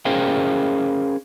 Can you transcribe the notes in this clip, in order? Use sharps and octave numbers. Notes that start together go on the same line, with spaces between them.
C#4 G#4 A#4 C5 F5 G5